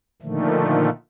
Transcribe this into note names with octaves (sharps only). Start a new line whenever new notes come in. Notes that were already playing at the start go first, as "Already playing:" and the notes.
A#2 D3 D#3 F3 A3